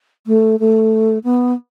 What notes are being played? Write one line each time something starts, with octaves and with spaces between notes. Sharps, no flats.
A3
A3
B3